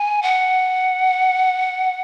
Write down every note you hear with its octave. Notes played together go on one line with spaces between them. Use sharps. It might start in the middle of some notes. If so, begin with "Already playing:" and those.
Already playing: G#5
F#5